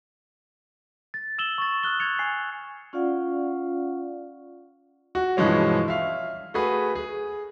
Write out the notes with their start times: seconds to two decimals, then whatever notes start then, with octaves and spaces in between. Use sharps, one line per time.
1.14 A6
1.38 E6 E7 F#7 G7
1.58 C#6 A6
1.83 D#6 F6 F#6 G7
1.99 G#6 A6 C#7 F7
2.19 G#5 C7
2.93 C#4 F4 D5 F5 F#5
5.15 F#4
5.37 G2 B2 E3 F3 G#3 C#4
5.88 E5 F5
6.54 A3 F#4 G#4 B4
6.95 G#4